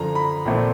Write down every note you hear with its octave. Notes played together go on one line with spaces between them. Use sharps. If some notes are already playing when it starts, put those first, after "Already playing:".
Already playing: F#2 D3 F3 A#5
B5
A#1 A#2 F3 A3 C4